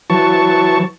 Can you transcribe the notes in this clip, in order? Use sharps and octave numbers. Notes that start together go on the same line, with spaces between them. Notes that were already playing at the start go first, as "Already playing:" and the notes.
E3 F#3 A5 C#6